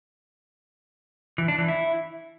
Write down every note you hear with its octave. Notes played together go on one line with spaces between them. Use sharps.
E3
D4
E3
E4